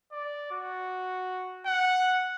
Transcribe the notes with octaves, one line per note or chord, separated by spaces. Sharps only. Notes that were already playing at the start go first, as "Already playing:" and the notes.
D5
F#4
F#5